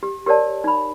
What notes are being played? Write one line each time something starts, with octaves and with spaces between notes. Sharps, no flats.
G4
G4 A#4 C#5 D5 A5
D#4 B5